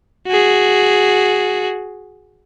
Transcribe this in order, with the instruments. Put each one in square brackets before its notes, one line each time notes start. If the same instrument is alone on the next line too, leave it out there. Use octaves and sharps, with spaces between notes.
[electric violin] F#4 G#4